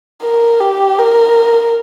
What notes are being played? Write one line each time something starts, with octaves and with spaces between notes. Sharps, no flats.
A#4
G4
A#4